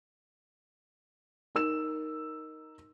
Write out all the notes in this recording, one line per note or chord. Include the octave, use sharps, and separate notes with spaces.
D#4 A#4 E6 E7